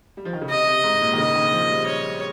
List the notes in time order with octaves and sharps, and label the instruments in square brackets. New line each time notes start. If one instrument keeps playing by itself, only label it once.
[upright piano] G3
F3
D#3
C#3
[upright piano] C3 [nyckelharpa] D#5
[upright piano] C3
G#2
A#2
D#3
[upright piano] C#3 [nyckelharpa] D#5
[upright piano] D#3
F3
G3
[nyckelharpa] C#5